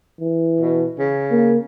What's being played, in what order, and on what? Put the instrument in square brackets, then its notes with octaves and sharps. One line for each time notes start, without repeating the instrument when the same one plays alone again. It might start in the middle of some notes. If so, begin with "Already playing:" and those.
[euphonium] E3
[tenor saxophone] B2
C#3
[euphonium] A#3